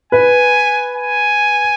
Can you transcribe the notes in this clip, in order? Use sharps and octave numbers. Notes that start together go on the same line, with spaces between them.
B4 G#5
G#5